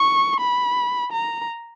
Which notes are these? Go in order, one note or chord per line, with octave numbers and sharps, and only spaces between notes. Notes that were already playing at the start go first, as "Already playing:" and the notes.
Already playing: C#6
B5
A#5